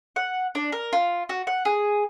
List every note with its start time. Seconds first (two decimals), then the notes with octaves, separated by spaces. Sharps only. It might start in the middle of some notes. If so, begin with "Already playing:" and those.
0.16 F#5
0.55 D4
0.72 A#4
0.93 F4
1.29 F#4
1.47 F#5
1.65 G#4